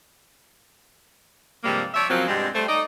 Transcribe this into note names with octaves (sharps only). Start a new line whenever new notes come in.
G2 C3 F3 G3 G#3 A#3
F3 C#5 D5 E5
C#3 F3 F#3 A#3 C4
G2 B2 G3 G#3 C4
G3 A3 C5
D#4 D5 D#5